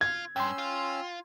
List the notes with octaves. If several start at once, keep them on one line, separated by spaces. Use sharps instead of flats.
F4 G#6
G2 C#4 G5 C6 E6
F4